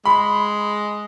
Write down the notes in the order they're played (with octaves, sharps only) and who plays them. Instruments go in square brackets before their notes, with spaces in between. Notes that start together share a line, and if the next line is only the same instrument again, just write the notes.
[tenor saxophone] G#3 [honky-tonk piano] B5